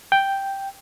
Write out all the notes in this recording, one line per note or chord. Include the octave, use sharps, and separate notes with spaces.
G5